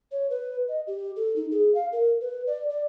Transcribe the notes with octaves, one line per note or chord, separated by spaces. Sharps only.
C#5
B4
D#5
G4
A4
D#4
G#4
F5
A#4
B4
D5
D5